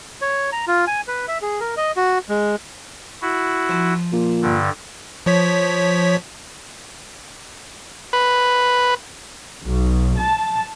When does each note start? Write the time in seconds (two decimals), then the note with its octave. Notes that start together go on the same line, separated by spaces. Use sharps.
0.21 C#5
0.52 A#5
0.67 F4
0.87 G#5
1.08 B4
1.28 E5
1.42 G#4
1.60 A#4
1.77 D#5
1.96 F#4
2.29 G#3
3.22 E4 F#4
3.69 F3
4.12 A#2
4.42 G2 D3
5.26 F3 C#5 B6
8.13 B4
9.63 B1
10.17 A5